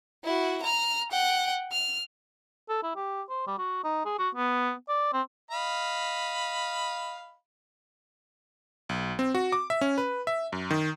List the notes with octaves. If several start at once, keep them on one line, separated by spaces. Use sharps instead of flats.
E4 F#4
A#5 F6
F#5 G5
F6
A4
E4
G4
C5
G3
F#4
D#4
G#4
F#4
B3
D5
C4
D#5 F5 B5
B1
C4
F#4
D6
E5
C#4
B4
E5
F#2
D#3